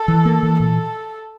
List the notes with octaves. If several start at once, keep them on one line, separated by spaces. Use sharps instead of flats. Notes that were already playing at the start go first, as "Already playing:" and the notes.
Already playing: A4
E3
A#3
E3
A#2 A4